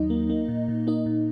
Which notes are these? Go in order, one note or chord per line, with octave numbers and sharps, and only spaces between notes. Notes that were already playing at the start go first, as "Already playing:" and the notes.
Already playing: D#2 F#3 D#4 D#5
A#3
A#3
A#2
A#2
A#3 D#4 D#5
A#2